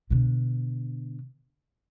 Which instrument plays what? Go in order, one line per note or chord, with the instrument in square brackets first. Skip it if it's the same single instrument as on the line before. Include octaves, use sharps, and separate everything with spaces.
[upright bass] B2 D3